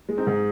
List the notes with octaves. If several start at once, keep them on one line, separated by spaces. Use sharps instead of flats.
G#3
C4 D#4
G#2